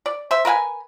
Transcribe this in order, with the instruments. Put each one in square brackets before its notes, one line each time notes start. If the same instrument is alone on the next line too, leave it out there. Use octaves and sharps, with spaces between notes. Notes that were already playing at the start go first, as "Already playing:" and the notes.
[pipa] D5
C5 E5
A#4 B4 F5 G#5